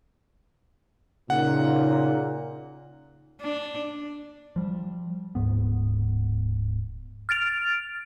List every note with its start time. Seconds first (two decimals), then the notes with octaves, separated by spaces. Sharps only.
1.30 A#2 C#3 D#4 F#5
3.41 D4
4.56 F3 G3
5.35 D1 G#2 B3
7.29 F6 A6 D7 F7